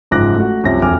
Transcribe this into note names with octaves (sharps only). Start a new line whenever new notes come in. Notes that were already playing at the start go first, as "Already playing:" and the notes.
F#1 G#2 F3 D6 F#6 A#6
A3 F#4
C2 F#2 C3 F3 A#6
E1 F2 G#5 D6 F6